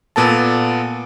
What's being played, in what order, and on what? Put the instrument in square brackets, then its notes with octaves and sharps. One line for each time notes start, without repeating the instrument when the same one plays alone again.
[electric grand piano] A#2 B3 A4 A5